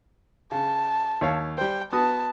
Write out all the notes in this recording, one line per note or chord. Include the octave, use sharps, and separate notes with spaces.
C#3 A5
D#2 C#5 F5
G3 C5 G5
B3 F#4 A5 D#6